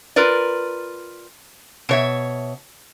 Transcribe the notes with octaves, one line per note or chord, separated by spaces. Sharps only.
F4 A#4 B4 D5
B2 C#5 E5